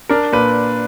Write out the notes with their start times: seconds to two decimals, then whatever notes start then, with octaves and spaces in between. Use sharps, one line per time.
0.09 D4 A#4
0.33 A#2 B4